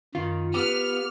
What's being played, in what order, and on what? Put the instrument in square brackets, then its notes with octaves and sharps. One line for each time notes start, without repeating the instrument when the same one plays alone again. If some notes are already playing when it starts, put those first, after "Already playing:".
[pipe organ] F#2 [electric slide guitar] D#3 [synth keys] F4
[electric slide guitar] B3 [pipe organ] G4 [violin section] F6